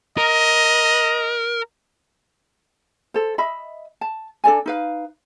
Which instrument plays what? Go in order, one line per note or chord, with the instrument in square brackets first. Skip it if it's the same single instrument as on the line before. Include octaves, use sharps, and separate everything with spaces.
[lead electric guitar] A#4 [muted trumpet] D#5
[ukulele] A4 C5
D#5 E5 B5
A5
D4 A4 D5 G#5
D#4 B4 F5